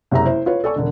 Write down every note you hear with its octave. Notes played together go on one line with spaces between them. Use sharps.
F#1 C3 E5 A#5
E4 C5
F4 B4 C#5
A4 D5 G#5 C#6
E1 D3